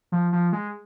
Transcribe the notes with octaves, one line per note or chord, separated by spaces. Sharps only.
F3
F3
G#3